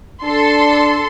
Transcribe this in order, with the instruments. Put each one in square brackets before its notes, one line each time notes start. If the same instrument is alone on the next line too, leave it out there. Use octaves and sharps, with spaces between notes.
[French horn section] D4 [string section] A4 C6